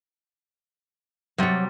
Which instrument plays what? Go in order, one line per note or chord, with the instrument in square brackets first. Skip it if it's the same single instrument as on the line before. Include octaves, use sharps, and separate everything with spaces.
[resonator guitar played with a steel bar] C3 G3 [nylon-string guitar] F#3 C#5